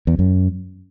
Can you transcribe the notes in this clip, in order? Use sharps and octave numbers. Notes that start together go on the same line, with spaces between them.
E2
F#2